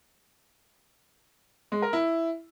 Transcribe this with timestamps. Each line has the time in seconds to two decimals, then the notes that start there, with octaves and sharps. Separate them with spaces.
1.72 G#3
1.82 A#4
1.93 E4